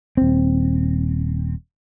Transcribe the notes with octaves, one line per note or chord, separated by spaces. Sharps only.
D#1 C4